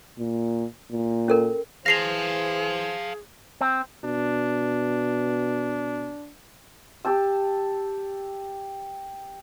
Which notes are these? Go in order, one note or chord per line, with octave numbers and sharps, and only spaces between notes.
A#2
A#2
C#4 A4 A#4
E3 G#4 C5 F5 A5 A#6 C7 F7
C4
B2 D4
G4 A5 E6